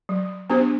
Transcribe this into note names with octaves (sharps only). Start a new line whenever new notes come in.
F#3
B3 D4 G4 C5